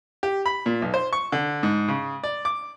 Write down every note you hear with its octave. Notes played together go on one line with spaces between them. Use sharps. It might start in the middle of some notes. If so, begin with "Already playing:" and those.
G4
B5
A#2
B1
C5
C#6
D3
G#2
C#3
D5
D6